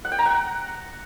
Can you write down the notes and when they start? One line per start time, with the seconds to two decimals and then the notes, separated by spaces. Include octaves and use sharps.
0.05 F#5
0.12 G5
0.19 A#5
0.26 F#5